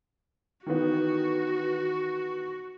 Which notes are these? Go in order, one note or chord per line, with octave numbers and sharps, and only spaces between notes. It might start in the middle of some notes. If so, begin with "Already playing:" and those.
D#3 E3 B3 F#4